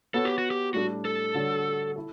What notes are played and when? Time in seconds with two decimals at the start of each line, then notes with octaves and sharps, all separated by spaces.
0.14 B3 F#4 A4 C#5
0.25 G4
0.38 F#4
0.51 G4
0.74 A2 G3 D4 F#4 A4
1.05 A4
1.35 D3 G3 D4 F#4 C#5
1.96 E4 A4